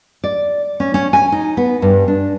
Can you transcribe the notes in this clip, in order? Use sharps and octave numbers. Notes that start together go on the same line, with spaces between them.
D5
C#4
C#4
G#5
D#4
B3
G2
D4